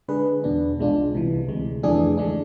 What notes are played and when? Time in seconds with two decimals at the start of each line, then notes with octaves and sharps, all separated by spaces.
0.08 D3 G#3 D4 G#4 B4
0.44 E2 B2 B3 D4
0.78 C2 B2 G#3 D4 F4
1.13 C2 C3 E3
1.48 D2 C3 G#3
1.83 F2 E3 A3 D4 G#4
2.18 D3 G#3 D4